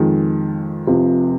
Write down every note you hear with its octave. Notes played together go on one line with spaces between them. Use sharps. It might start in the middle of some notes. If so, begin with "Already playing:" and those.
Already playing: F2 D#3 G#3
F1 F2 C3 F3